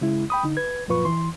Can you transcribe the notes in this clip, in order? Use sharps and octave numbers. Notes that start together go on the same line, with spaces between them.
C#3 G#3 E4
G5 B5 D#6
D3 D#4
B4 G#6
F#2 A#2 F3 F4 B4 C#6
E3 C6